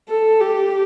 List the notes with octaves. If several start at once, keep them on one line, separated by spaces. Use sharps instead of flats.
A4
G4